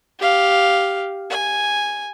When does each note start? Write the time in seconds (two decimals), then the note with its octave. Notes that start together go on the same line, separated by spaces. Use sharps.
0.20 G4 F5
1.30 G#5